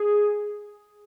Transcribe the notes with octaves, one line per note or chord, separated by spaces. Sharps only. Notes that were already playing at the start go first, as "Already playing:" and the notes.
Already playing: G#4